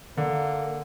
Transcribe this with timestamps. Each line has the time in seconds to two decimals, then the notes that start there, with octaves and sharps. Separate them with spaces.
0.17 D3 A#3